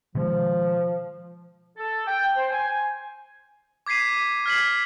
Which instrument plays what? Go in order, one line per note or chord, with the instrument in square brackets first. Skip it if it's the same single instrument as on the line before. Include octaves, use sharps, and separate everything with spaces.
[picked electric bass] B2 D#3 G#3 [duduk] F3
[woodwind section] A4
G5
C5
G#5
[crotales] D6 G#6 B6 C7 D#7
F6 G#6 B6 C7 F#7